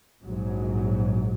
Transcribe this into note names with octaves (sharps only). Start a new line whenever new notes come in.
A#1 G#2 F#3